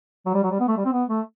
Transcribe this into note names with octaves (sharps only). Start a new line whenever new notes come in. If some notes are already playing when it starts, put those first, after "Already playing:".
F#3
G3
F#3
G3
B3
A3
G3
C4
B3
A3